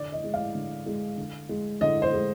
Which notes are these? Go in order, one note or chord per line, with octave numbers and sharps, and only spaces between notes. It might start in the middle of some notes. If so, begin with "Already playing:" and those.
Already playing: D3 D5
D#5
G#3
F5
D3
G#3
D3
G#3
D3 D#5
C5
G#3